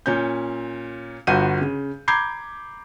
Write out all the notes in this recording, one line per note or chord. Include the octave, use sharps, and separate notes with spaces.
A#2 C#4 G6
G1 F4 F#4 G6 D#7
C#3
A#5 B5 D6 G6 G#6 C7